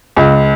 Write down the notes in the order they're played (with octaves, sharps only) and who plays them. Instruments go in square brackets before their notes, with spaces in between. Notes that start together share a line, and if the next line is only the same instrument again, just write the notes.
[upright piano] C#2